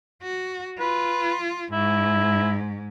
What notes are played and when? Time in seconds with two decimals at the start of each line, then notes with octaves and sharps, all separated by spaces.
0.23 F#4
0.79 F4 B4
1.72 G#2 E4